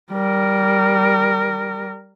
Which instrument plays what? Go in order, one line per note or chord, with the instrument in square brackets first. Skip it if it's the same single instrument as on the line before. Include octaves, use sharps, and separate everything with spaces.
[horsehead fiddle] G3 A#4